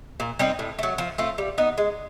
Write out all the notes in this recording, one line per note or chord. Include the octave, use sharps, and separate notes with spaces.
A#2
G3 C4 D#4
A2
F#3 A3
F3
A3 C4 F4
G3
B3 D#4
G#3